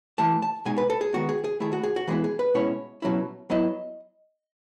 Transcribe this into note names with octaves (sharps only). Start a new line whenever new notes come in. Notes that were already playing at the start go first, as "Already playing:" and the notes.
E3 A3 E4 A5
A5
B2 G#3 D#4 G#5
B4
A4
G#4
D#3 G#3 B3 F#4
G#4
G#4
D#3 A3 E4 G#4
F#4
G#4
F#4
E3 G#3 B3 E4 G#4
G#4
B4
B2 G#3 C#4 E4 C#5
B2 F#3 C#4 E4
F#3 B3 E4 D#5